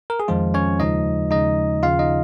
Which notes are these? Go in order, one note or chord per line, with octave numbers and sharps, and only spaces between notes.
A#4
G#4
F2 D#3 F3 G#3 F4
C#4 C#5
D#2 C#3 F3 G#3 D#4 D#5
D#2 C#3 F3 G#3 D#4 D#5
D#2 C#3 F3 F4 F5
D#4 D#5